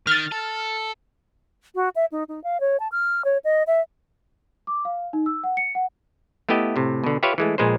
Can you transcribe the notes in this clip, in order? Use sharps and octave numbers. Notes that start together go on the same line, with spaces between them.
D#3 F6 A6
A4
F#4
E5
D#4
D#4
F5
C#5
A5
F6
C#5
D#5
E5
D6
F5
D#4
E6
F#5
C#7
F#5
A3 B3 E4 G4 D#5
A2 C3
B2 D3
F4 G4 B4 C#5 E5 F5
E3 G#3 A3
A#1 A#2 G#3 B4 C5